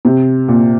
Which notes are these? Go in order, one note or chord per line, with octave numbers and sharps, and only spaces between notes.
C3
A#2